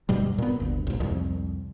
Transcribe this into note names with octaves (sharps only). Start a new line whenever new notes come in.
D2 G2 B2 G3
A#2 B3
G1 D2
B1 G#2
C2 F2